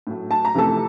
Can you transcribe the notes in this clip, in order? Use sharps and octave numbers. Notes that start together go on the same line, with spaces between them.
A2 F#3 A3
A5
A#5
F2 C3 E3 A3 A4 A5